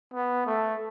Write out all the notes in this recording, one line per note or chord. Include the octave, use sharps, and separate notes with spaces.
B3
A3